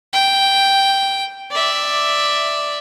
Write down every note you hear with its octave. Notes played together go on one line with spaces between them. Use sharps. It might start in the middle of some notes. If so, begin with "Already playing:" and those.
G5
D5 E5